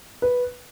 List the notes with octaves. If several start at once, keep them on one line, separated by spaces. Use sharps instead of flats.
B4